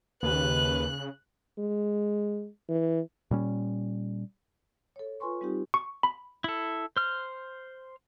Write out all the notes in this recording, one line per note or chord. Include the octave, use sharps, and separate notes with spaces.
D#2 C#3 B4 F#6
G#3
E3
A#2 G3 C#4
A4 C#5
F4 B4 G#5 C6 C#6
G3 C4 D#4 F4 G4
C#6
B5
E4 A4
C5 F6